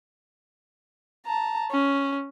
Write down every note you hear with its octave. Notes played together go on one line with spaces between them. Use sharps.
A5 A#5
C#4